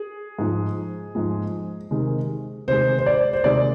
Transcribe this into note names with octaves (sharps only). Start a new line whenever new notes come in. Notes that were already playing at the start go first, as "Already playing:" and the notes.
Already playing: G#4
G#2 F3 G#3
G#2 F3 G#3
C3 D#3 G#3
C3 D#3 G#3 C5
C5
D5
C5
C3 D#3 G#3 D5